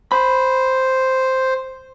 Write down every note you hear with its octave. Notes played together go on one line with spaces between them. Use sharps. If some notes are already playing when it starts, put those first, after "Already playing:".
C5 B5